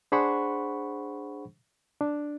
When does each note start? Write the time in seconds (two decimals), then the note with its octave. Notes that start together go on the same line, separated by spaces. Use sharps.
0.12 D4 G#4 C5 F#5 B5 C#6
2.01 D4